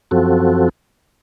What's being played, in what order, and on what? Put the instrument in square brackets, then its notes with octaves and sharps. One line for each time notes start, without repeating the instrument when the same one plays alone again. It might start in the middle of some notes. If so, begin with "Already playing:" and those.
[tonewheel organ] F#2 F3 C4 F#4 A4